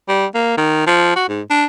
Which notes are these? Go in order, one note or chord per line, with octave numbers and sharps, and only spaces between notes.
G3
A#3
D#3
F3
F#4
G#2
D4